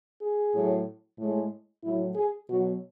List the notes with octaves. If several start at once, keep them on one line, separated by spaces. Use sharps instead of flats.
G#4
A2 F#3
A2
G#3
A2 F#3 E4
G#4
B2 F#3 F#4